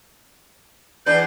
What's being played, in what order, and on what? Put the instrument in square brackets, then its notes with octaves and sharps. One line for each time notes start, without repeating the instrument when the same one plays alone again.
[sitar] E2 D4 B4 [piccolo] G6